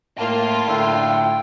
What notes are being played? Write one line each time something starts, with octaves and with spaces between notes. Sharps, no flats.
A2 A#3 F4 G5 A5
A2 D3 A3